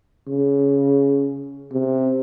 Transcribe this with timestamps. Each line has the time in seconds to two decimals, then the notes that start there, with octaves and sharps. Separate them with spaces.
0.27 C#3
1.73 C3